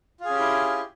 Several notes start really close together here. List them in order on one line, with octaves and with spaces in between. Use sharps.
F4 G#4 C#4 G4 E4